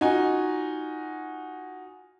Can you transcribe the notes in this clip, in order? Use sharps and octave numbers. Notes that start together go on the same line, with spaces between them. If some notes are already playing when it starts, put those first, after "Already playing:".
D#4 F4 F#4 G#5